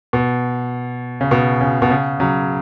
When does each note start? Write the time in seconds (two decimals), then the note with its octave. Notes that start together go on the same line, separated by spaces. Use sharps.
0.13 B2
1.21 C#3
1.31 B2
1.61 C#3
1.82 B2
1.91 C#3
2.20 C#3 F#3